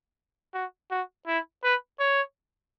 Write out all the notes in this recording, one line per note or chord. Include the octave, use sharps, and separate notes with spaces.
F#4
F#4
E4
B4
C#5